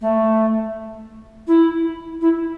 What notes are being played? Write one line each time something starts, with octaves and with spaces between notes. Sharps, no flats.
A3
E4
E4